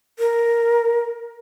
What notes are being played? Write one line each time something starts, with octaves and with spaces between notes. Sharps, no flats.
A#4